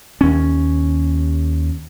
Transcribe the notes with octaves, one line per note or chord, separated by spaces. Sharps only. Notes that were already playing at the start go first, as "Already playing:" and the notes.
D#2 C#4